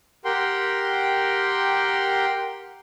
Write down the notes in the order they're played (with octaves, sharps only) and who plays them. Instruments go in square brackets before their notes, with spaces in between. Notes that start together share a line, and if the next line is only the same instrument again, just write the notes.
[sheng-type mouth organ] G4 A#4 F#5 G5 C6